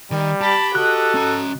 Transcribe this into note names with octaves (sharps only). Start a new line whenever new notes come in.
D#3 G3
G4 A5 B5
F#4 A4 D#5 F#6
C#4 A#5